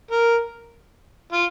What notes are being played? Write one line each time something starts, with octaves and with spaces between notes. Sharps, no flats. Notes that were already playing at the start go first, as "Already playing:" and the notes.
A#4
F4